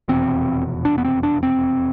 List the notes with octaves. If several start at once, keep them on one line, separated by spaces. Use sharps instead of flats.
F1 E2 B2 C4
D4
B3
C4
D4
C4